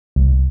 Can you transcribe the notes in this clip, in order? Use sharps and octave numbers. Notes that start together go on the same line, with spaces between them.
C2